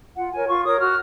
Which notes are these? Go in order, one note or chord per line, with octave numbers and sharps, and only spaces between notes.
F4 F#5
A#4 C#5 G#5
F4 C#6
A#4 C#5 D#6
F#4 F6